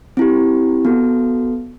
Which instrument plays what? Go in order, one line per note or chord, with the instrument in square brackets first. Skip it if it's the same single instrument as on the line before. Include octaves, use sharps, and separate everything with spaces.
[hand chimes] C4 E4 G4
B3 F#4 A4